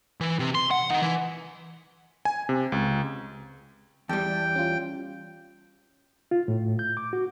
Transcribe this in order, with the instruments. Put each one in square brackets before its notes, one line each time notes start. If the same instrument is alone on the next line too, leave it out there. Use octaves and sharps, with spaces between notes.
[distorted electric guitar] E3
C3
C6
F#5
D#3
E3
[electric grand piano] G#5
C3
C#2
[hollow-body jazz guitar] E2 G3 [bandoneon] G5 [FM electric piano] A5
[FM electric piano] C#4 F4
[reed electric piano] F4
A2
G6
D6
F#4